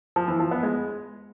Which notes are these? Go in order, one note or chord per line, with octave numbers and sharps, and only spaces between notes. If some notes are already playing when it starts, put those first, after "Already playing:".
F3
E3
F3
B3
G#3